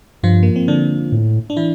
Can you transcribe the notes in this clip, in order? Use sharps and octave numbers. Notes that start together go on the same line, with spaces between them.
G2 F3 F4
A#3
C4
D3 D4
A2
D4
E3 E4